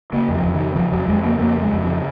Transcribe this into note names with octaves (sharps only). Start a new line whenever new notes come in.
C#3 A#3
F2
F3
F2
D#3
C#3
C#3 F3
F2 F#3
F2 G#3
C#3 A#3
F2 A#3
C#3
G#3
F2
C#3 F3